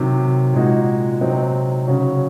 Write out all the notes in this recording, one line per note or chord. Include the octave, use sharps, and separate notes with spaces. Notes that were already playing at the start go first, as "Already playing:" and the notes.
Already playing: C3 D#3 F#3
A#2 G#3 D#4 F#4
C3 F#3 C4 D#4
C#3 F#3 C#4 F#4